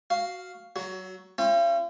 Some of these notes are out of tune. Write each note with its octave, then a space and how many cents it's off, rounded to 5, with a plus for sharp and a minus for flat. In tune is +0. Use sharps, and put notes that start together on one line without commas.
F#4 +0 F5 +0
F#3 +20 F#4 +0
C#4 -35 F4 -45 G5 +20